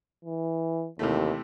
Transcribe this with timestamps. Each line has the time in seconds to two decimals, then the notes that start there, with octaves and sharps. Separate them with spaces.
0.25 E3
0.99 D#2 C3 E3 A3